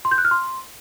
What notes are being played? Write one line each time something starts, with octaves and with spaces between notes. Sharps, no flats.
C6
G6
F#6
F6
C6